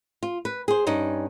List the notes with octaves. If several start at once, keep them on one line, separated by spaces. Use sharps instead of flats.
F4
B4
G#4 C5
G2 C#4 D#4